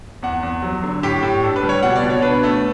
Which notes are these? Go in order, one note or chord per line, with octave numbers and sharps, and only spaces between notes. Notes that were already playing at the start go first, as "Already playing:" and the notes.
E2 F#5
E2
F#3
D3
A2 G4
A2
D4 A4
B4
G3
C#5
B2 F#5
D5
B2
C#5
D4 B4
A3